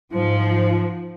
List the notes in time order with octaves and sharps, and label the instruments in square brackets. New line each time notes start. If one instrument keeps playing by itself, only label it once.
[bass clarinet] G#2 [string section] F3